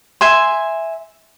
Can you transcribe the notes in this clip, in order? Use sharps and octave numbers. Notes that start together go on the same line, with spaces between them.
E5 G#5 C6